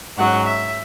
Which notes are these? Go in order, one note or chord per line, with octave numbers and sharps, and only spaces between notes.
G#2 F#3 C#4 F#5
E5